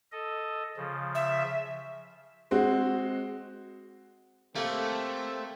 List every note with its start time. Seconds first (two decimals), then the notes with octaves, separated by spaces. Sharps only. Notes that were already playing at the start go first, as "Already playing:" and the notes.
0.12 A4 D#5
0.77 C#3 F3
1.15 E5
2.51 G#3 C4 F#4
4.56 A3 A#3 C4 G4 A4